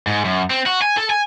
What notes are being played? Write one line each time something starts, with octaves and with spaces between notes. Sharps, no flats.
G#2
F#2
C4
F#4
G#5
A4
G#5